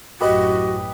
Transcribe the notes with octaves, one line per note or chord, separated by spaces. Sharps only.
A1 F#2 F#4 G4 B4 D#5